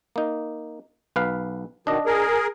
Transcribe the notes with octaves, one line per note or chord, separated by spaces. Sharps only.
A#3 D#4
B1 B4 F5
B2 D#3 D4 D#5
G#4 A#4